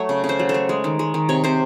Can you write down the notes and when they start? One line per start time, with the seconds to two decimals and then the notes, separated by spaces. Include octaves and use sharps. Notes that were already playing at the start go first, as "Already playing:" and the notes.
Already playing: F#3 A3 C#5
0.09 C#3
0.24 C#3
0.29 C5
0.39 F#3
0.49 A4
0.54 A3
0.69 G#3
0.84 D#3
0.99 G#3
1.14 D#3
1.29 C3 C#5
1.44 C3 C5